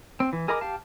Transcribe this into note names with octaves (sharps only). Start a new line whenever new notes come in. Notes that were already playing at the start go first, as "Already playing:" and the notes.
C4
E3
G#4 A#4 D#5 B5 D6
G4 F5 A5